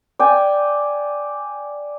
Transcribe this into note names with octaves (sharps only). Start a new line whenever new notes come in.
D5 G5 G#5